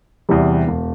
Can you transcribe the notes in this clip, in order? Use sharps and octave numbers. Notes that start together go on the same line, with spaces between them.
E2 C3 E3 G3
E1